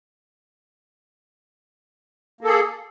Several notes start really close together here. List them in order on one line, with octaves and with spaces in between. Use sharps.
A#3 A4 G#4